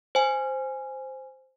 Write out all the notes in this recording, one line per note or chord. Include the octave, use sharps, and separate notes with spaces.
C5 G#5